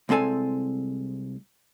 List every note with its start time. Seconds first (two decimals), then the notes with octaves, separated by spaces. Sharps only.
0.09 C2 G#3 C4 A4 G#5